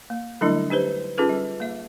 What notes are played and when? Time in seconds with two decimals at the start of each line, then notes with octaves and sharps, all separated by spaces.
0.10 A#3
0.41 D3 F#3 G3 A3 D4 E4
0.70 D#4 G4 B4 C5
1.17 C#4 D#4 F4 G#4 A4 B4
1.29 G3
1.60 A#3 E5